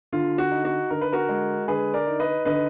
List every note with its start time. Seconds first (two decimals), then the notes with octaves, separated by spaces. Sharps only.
0.12 D3 F4
0.38 F#4
0.51 D#4
0.65 F#4
0.90 D3 A#4
1.01 B4
1.12 F#4 A#4
1.29 G#3
1.68 D3 G#4 B4
1.94 A#4 D5
2.07 D#4
2.20 B4 D#5
2.45 D3 B4 D#5